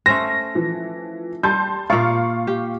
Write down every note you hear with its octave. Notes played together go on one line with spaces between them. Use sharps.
A3 C#4 C5 A#6
E3 F3
G3 A5 C6 G6
A#2 F4 D5 F5 C#6
G4